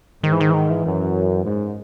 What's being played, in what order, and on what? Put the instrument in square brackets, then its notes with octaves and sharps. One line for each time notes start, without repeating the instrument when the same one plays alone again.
[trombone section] G#2 [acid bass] D#3
[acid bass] E3
D#3
E3
D#3
E3
[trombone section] F#2
[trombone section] G#2 [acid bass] G#3